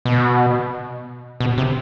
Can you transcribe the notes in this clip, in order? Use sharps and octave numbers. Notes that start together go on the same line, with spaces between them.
B2
B2
C3